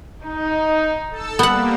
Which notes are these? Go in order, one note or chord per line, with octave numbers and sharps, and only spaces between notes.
D#4
A4 A5 E6
G3 A#3 B3 F#5